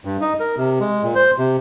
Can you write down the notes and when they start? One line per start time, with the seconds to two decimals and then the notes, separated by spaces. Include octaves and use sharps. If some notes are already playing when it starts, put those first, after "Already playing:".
0.05 G2
0.21 D#4
0.40 A#4
0.57 C3
0.80 G#3
1.03 A#2
1.15 C5
1.38 C3